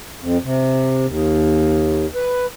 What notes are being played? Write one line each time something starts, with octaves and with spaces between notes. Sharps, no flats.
F2
C3
D#2
B4